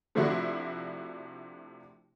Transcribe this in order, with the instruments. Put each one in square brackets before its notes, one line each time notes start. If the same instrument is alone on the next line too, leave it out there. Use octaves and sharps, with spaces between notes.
[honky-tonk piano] C3 F3 A3 D4 E4 F#4